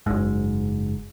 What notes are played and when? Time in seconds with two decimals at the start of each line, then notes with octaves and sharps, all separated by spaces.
0.06 F#1 G#2